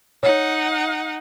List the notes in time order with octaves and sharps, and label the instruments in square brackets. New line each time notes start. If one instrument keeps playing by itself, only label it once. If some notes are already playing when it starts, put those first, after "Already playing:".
[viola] D#4 F#5 [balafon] C#5